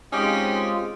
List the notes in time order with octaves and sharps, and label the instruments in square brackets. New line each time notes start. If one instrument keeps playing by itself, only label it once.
[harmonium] G#3 C4 F4 [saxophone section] C#4 D#4 G4